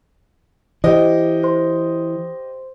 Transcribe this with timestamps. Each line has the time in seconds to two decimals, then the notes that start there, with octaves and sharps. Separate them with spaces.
0.84 E3 G4 C5 D#5
1.43 C5 C6